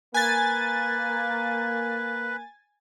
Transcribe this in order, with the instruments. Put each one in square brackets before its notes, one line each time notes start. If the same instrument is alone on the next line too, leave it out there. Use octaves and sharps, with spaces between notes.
[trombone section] A#3 [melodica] B4 [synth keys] G#5 A6